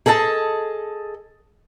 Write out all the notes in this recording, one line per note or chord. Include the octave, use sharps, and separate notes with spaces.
G#4 A4 D#5 F#5 A5